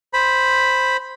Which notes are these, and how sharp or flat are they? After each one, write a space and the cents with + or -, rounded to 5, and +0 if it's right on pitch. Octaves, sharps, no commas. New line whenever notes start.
C5 +0 B5 +0